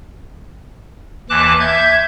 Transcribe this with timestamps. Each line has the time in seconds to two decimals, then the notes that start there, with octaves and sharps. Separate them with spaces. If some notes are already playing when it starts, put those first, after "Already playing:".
1.30 D#2 E3 A5 D6 F#6
1.60 E5 G6 G#6